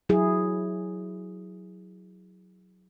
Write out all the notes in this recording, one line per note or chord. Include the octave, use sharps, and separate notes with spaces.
F#3 E4 G#4